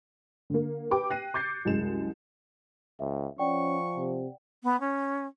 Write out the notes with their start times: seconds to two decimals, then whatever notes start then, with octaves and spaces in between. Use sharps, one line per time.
0.50 D3 A#3
0.91 G4 B4 G5 D6
1.10 G5 F#6 A#6 C7 D#7
1.34 D6 G6 A6 C7 C#7
1.65 C2 F#2 G#3 E7
3.00 C#2 E5
3.39 F3 C#4 D5 F#5 G5 C#6
3.96 C3
4.64 B3
4.80 C#4